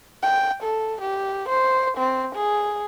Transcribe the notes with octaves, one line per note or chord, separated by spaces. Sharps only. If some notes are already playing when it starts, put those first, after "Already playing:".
G5
A4
G4
C5
C4
G#4